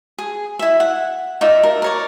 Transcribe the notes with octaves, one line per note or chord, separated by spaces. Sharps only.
G#4
E4 E5
F#5
D#4 F4 D5 E5
A#4
A#4 C#5 D5